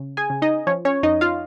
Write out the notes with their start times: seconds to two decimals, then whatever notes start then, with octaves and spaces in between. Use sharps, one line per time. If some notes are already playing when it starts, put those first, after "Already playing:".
Already playing: C#3
0.17 G#4 G#5
0.30 C#3
0.42 D#4 D#5
0.67 F3 C#4 C#5
0.85 C#4 C#5
1.03 F2 D#4 D#5
1.21 F4 F5